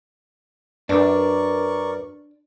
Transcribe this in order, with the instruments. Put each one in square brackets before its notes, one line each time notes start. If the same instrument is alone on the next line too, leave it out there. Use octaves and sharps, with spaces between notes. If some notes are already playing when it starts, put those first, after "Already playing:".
[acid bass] F#2 [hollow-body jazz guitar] D4 [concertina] A#4 D5 C#6 [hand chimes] B4